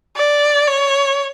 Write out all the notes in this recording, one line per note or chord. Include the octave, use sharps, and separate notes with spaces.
D5
C#5